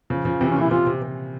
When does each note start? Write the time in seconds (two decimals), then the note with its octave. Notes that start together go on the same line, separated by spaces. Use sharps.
0.10 C#3 F3
0.25 C#3 F3
0.41 C3 E3 C4
0.51 C#4
0.56 A#2 E4
0.71 C3 F4
0.86 C3
1.02 C3